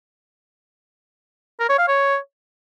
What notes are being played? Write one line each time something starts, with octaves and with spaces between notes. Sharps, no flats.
A#4
C#5
F5
C#5